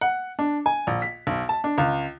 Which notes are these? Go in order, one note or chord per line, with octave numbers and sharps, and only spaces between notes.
F#5
D4
G#5
A#1
B6
B1
A5
D4
C#2